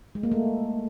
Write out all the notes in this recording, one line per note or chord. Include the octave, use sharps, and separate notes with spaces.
G#3
A#3
A3